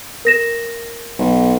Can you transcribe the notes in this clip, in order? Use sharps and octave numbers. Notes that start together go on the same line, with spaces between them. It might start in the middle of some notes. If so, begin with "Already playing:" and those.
A#4 A#6 E7
B1